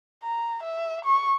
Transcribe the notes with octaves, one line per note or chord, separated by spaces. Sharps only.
A#5
E5
C#6